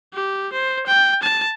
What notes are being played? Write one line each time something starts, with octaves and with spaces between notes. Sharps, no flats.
G4
C5
G5
A5